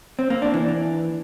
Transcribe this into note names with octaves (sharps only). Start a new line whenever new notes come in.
C4
A#3
D4
E3